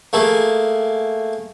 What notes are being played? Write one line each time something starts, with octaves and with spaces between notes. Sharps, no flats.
A3 A#3 G#4